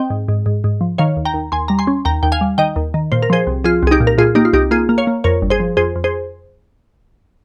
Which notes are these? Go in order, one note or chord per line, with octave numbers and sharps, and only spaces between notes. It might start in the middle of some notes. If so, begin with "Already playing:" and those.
Already playing: C4 D#5 G5
G#2
G#2
G#2
G#2
F3
D#3 C#5 F5
D#2
G5 A#5
D#2
D#2 G#5 C6
G3 A#5
G#5 C6
C#4
D#2 G5 A#5
D#2 G5
F5 G#5
G3
D#3 D#5 G5
D#2
D#3
A#2 C5
A#4
F3 G#4 C5
C2
F3 F4 G#4
C2 G#4
D#4 G4
A#2
A#4
A#2 F4 G#4
A#3 D#4 G4
F4
C2 D#4 G4
A#3 F4 G#4
A#3
C#5 F5
A#3
F2 A#4 C#5
G1
G#4 C5
F3
F2 G#4 C5
F2
G#4 C5